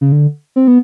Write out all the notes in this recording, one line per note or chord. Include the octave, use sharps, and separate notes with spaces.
C#3
D3
C4
B3